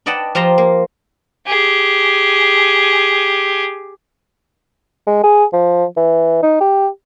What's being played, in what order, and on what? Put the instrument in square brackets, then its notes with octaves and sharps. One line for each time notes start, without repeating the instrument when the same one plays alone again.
[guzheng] B4 D5 D#5 F#5 G5 A5
F3 F4 G4 A#5 C6
A#3
[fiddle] G4 G#4
[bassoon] G#3
G#4
F3
E3
D#4
G4